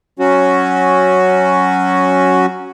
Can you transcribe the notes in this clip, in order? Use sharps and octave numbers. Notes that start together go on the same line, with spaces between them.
F#3 C#4 F#4